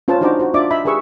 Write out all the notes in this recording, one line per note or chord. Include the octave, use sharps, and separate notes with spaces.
C#4 F4 B4 C5 A5
D4 D#4 F#4 C5 A#5 D6
F#4 C5
D4 F4 D5 E5 D6
D#5 E5 B5
G4 G#4 A#4 B4 C#6 E6